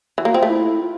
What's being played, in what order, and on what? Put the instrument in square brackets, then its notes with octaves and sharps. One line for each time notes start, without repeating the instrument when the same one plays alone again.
[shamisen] E3 [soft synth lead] F#4
[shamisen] A#3
[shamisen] C4 [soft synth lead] F4
[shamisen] A3
[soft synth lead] E4
F4